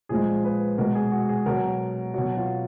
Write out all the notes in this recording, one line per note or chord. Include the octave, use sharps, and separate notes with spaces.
A#2 F3 G#3 G#4
B4
B2 G#3 A#4
G#4
F#4
G#4
B2 F#3 A#4
B2 F#3 F#4
F4